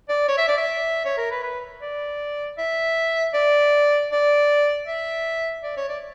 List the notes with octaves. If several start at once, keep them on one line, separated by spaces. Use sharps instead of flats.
D5
C#5
E5
D5
E5
C#5
A#4
B4
B4
D5
E5
D5
D5
E5
D5
C#5
D5